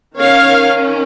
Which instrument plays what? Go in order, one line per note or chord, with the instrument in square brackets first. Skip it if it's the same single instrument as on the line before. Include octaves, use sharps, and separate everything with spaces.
[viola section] D#3 C#4 C#5 F5